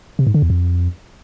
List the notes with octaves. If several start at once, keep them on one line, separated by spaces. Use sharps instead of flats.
C3
G#2
D3
E2
F2